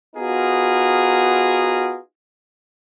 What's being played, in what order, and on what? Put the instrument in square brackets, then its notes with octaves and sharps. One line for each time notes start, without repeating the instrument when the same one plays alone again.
[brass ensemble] B3 D#4 F4 F#4 G#4 A#4